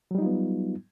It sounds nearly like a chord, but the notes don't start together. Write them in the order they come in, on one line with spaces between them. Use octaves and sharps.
F#3 G3 D#4 F4 B3